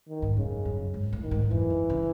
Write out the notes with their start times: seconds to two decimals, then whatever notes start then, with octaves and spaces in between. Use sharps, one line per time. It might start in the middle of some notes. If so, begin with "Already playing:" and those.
0.08 D#3
0.22 G#2
0.37 F#2 C#3
0.65 F#2
0.94 G#2
1.13 A2
1.22 D#3
1.31 G#2
1.51 F#2 E3
1.70 E2
1.90 C#3